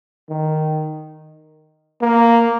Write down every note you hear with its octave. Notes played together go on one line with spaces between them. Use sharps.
D#3
A#3